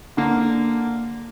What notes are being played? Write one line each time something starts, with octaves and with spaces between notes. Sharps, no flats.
D3 A#3